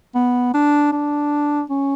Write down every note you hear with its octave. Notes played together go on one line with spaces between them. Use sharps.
B3
D4
D4
C#4